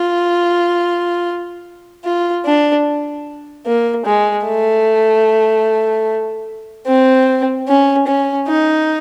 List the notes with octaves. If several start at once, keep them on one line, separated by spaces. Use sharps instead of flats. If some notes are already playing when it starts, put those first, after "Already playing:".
Already playing: F4
F4
D4
A#3
G#3
A3
C4
C#4
C#4
D#4